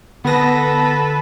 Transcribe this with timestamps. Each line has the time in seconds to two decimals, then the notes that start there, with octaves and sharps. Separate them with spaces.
0.25 D3 B3 A4 B4 A#6